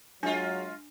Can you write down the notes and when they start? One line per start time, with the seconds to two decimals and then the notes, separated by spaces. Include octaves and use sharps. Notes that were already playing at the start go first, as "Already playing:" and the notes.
0.23 F#3 G#3 D4 F4